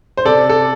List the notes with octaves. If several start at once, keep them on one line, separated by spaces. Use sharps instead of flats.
C5
C3 A4 D5
A4